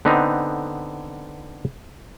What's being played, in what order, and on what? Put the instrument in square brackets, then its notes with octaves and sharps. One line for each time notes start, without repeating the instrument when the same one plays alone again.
[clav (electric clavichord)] D3 B3 C4 D#4